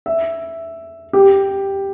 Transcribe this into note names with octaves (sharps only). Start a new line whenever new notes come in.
E5
G4